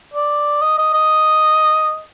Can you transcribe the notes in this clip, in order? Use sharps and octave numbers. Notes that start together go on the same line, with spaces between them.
D5
D#5
D#5
D#5